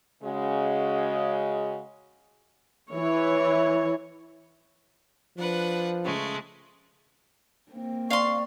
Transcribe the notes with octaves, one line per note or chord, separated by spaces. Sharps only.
C#3 G#3 F#4
E3 C#5
F3 D4 B4 F#5
C#3 G#3 A3
A#3 C4
D5 F5 C6 C#6